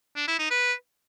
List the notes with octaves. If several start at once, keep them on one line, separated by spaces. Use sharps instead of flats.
D4
E4
D#4
B4